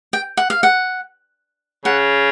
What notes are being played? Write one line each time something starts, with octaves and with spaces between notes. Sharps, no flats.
G5
F#5
F5
F#5
C#3 F#5